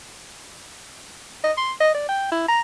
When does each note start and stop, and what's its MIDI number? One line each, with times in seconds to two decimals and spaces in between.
1.44 1.52 75
1.57 1.72 84
1.80 1.94 75
1.94 2.08 74
2.09 2.27 79
2.32 2.46 64
2.48 2.61 82